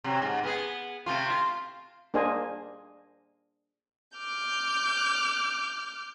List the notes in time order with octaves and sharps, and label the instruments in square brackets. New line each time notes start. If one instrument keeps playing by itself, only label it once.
[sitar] C3 F#3
G#2
B3 G#4
C3 A3 F4
F4
[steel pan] A#3 D4 G#4 C5 D#5 G#5
[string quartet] D6 F6 G6